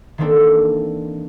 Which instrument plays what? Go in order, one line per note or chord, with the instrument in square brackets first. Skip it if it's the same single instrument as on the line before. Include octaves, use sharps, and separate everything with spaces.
[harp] D#3 E3 A#3 C4 D4 A4